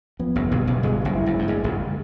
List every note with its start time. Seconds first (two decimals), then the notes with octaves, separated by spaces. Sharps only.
0.19 F2 B3
0.35 F#1 F#2
0.51 G1 G2 B2
0.67 F#1 F#2
0.83 G1 G2 G#3
1.05 F#1 F#2
1.16 E4
1.26 F#1 F#2
1.39 G2
1.48 F#1 F#2 G#3
1.64 G1 G2